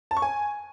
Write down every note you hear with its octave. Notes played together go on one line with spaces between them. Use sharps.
A5
C#6
G#5